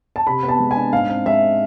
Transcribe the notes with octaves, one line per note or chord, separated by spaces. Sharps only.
A5
C3 B5
B3
A5
G#3
G#5
D4
G#2 F5
C4
G#3 E5